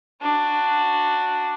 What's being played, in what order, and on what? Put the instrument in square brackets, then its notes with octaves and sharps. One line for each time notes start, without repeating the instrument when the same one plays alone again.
[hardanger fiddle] D4 F#4